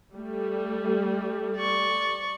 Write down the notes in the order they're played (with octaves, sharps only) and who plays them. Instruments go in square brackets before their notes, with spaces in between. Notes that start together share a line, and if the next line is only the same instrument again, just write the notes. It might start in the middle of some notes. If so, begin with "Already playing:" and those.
[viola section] G3 A3
[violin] D5 C#6